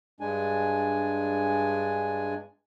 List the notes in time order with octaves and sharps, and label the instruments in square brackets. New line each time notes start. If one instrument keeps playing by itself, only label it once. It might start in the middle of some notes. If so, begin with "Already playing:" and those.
[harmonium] G2 G#3 D4 G#5